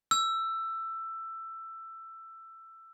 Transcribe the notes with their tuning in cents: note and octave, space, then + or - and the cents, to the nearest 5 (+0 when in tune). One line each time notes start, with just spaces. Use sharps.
E6 +15